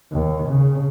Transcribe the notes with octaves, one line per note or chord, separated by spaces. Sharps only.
D#2
C#3